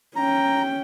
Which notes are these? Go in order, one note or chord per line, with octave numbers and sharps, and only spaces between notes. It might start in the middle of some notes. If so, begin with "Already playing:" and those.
C#4 G5 A#5